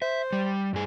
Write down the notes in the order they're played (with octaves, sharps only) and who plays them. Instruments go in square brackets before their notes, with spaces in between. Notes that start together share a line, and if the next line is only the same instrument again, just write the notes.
[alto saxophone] C5 [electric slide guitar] E5
[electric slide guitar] G3
G2 G#4